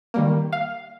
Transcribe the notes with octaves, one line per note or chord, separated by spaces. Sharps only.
D#3 G3 A#3
F5